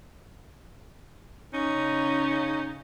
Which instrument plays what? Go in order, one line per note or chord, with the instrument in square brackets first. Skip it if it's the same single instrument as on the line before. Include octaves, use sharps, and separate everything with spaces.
[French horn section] C#3 [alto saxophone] C#4 [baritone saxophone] D#4